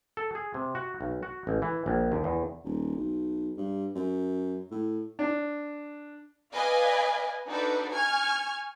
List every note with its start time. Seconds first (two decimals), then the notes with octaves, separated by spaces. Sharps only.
0.17 A4
0.35 G#4
0.54 C3
0.75 F#4
1.01 B1
1.23 F#4
1.47 A1
1.62 E3
1.86 A#1
2.12 D#2
2.24 E2
2.64 D#1
2.96 B1
3.57 G2
3.95 F#2
4.71 A2
5.19 D4
6.54 B4 D5 D#5 F5 G#5
7.47 D4 D#4 F#4 A4 B4 D5
7.91 G#5 C#6 F6 G#6